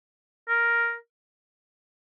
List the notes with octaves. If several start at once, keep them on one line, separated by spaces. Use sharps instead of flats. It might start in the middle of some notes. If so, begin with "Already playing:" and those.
A#4